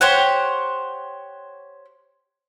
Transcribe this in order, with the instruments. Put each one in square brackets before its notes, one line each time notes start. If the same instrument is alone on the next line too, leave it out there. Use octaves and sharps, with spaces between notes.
[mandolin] G4 C5 C#5 F#5